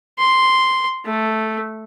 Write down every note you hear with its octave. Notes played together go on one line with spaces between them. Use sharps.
C6
A3